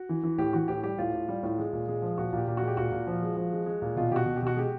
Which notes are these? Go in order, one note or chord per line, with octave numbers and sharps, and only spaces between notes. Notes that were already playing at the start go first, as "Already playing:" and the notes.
Already playing: F#4
E3
E3
A2 G4
E3 F#4
A2 G4
G3 G4
A2 F4
A2
G3
A2
G#3
A#2
G#3
F3
A#2 F#4
A#2 G4
A#2
G#3 F#4
G4
A#2 F#4
A#2
F3
G#3
F3
G#3
G#3
A#2
B2 F4
B2 F#4 G4
B2
G4
B2 F#4
G#3 G4